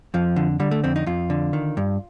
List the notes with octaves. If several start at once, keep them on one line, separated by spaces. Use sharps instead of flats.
F2 F3
D3
D3 G3
A3
F2 C4
D#4
F2 F4
D3
D#3
G2